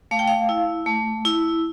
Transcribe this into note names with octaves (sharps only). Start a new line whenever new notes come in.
A3 F5
G5
F5
E4
A3
E4